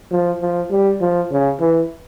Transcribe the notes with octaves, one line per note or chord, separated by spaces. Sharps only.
F3
F3
G3
F3
C#3
E3